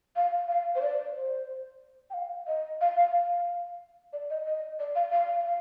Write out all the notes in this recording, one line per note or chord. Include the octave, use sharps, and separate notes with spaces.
F5
F5
C5
D5
C5
G5
F5
D#5
F5
F5
F5
D5
D#5
D#5
D5
F5
F5
F5